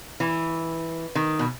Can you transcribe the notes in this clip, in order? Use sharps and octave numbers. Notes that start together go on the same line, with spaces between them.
E3
D#3
B2